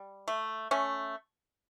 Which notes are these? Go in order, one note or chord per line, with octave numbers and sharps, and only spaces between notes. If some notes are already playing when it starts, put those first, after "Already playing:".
Already playing: G3
A3
A3 C#4